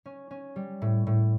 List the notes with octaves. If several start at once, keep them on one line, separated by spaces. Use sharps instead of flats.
C#4
C#4
G3
A2
A2